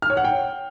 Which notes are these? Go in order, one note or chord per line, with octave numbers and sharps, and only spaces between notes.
F6
C#5
F#5
G5